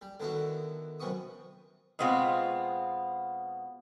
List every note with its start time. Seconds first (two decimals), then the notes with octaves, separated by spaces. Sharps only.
0.02 G3
0.20 D3 D#3 B3 E4 F#4
1.00 F#2 C3 B3 C#6 D#6
1.99 B2 G#3 B3 C4 F4